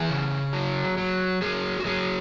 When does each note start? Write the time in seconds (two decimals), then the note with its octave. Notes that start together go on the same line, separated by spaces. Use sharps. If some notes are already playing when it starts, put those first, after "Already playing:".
Already playing: E3 G#4
0.10 C#3
0.53 F#3
0.98 F#3
1.42 F#3 G#4
1.80 F#4
1.85 F#3 G#4